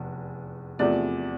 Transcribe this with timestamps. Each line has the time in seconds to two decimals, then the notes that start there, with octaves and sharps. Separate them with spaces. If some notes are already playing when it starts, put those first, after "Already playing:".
Already playing: F1 E2
0.79 E2 C3 F3 A3 D5